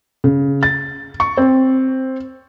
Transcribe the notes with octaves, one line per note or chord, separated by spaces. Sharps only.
C#3
A6
C#6
C4